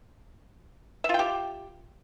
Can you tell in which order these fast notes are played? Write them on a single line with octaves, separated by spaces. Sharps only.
E5 F4 G5 G4